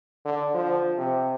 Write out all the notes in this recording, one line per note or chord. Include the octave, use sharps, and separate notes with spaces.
D3
F3
C3